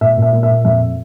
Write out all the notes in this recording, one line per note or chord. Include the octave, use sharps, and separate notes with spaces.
A#2 E5
A#2
E5
A#3
E5
A#2
F2 E5